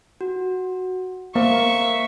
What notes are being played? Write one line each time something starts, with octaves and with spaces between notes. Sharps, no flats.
F#4
A#3 A#4 C5 E5 F5 C#6